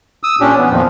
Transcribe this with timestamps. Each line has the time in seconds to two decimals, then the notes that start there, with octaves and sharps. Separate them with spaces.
0.23 D#6 E6
0.40 A#2 C#4 D4 G4
0.57 E3 B3
0.70 F2 A#2 D#3 F3